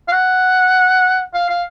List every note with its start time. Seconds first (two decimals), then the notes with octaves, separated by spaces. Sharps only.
0.08 F5
0.12 F#5
1.34 F5
1.49 F5